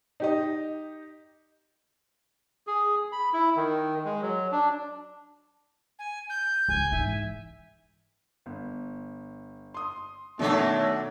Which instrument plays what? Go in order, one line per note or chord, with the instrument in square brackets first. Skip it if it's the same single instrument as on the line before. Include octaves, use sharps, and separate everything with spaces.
[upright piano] D#4 G4 D#5
[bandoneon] G#4
B5
E4
D#3
G#3
F#3
D4
[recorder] G#5
G6
[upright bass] C#2 [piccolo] G#5
[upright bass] G#2 E3 [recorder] E5
[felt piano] G1
C6 D#6
[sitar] F#2 F#3 D4 [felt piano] B2 D#3 A4 [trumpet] A3